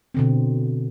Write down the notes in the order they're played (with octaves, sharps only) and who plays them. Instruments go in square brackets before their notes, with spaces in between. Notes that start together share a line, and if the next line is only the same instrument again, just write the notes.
[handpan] B2 D3 C4